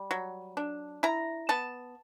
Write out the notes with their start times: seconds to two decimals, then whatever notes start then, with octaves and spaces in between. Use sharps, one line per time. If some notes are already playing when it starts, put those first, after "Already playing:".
Already playing: G3
0.11 F#3
0.57 D4
1.03 E4 A#5
1.49 B3 A5